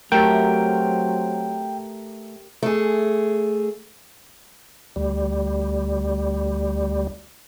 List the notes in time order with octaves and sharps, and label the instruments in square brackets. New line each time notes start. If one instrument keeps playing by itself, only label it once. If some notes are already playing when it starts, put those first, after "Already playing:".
[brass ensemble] F#3 C4 [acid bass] A3 [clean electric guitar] G4 A#4 [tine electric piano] G5
[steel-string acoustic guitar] A3 G#4
[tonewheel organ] D2 G3